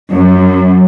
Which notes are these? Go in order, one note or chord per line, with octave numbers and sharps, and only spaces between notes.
F#2